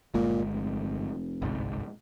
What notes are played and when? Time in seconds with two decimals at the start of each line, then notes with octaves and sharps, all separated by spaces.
0.14 G1 A#2 G#3
0.54 F1
1.42 G1 C2 G#2